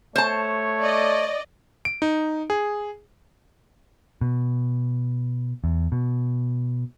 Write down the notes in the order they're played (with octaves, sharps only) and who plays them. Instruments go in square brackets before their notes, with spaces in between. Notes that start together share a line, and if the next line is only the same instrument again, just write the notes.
[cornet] A3 [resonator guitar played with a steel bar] C5 A5 [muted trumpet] C#5
[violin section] D5 D#5
[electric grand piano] D7
D#4
G#4
[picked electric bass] B2
E2
B2